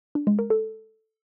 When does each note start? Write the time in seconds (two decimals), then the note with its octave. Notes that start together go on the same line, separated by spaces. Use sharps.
0.15 D4
0.27 G#3
0.39 A#4
0.50 A4